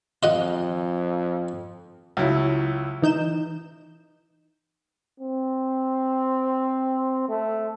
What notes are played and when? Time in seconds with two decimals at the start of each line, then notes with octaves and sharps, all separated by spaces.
0.23 F2 F4 D#5 F#5
2.17 C#2 F#3 E4
3.02 E3 D#4 G6 E7
5.20 C4
7.28 A3